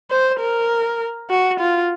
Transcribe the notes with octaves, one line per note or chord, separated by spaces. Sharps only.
C5
A#4
F#4
F4